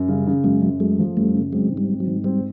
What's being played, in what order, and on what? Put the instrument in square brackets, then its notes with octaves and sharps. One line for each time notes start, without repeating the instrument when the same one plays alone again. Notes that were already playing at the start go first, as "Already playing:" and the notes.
Already playing: [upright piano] F#2
[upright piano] C#3 [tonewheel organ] G3
[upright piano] C#3
[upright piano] F#2 [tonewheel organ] F#3 G#3
[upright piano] F#2
[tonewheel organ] F#3 G#3 [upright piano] A3
[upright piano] F3
[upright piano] F#2 [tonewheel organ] G3 A3
[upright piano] C#3
[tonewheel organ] F#3 G#3 [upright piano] C4
[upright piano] G#2
[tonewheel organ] G3
[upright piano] C4
[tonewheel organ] F#3
[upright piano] G#2
[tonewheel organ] G3 [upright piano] C4